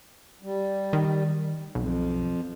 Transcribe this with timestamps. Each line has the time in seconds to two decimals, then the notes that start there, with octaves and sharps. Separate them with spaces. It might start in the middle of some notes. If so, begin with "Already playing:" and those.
0.43 G3
0.93 D#3
1.75 B1 F2